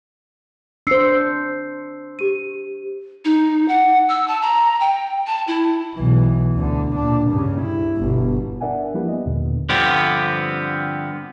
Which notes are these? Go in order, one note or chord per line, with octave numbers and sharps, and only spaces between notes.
D4 C5 E6 C7 C#7
G4 D#7
D#4
F#5
E6
A5
A#5
G5
A5
E4
B1 E3
D2 D3
A#2 D4
G2 C#3
E4
G1 B2
D4 A#4 D5 E5 F#5 G#5
F3 G3 A#3 E4 G4 B4
B3 D#5
D#2 A#2 D3
G2 D3 F3 B3 C4 G4